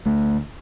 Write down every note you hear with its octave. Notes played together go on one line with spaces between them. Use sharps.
D2 A3